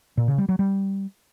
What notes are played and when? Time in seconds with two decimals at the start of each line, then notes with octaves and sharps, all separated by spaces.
0.17 A#2
0.28 C#3
0.38 G3
0.49 F#3
0.59 G3